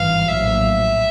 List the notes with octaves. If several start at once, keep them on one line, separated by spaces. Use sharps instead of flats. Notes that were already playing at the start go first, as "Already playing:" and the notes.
Already playing: G#1 G2 E3 F5
A#1 A2 F#3 E5